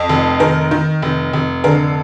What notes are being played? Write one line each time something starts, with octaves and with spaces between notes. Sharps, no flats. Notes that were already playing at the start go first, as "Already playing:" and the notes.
Already playing: F2
F1
D#3 A#4
D#3
F1
F1
D3 A#4